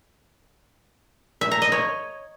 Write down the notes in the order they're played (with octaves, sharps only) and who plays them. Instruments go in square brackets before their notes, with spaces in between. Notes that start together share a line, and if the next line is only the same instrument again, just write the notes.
[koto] E5
A#5
D#5
C#5